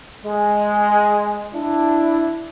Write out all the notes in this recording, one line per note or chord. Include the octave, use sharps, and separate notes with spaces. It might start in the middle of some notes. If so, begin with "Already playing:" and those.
G#3
D4 E4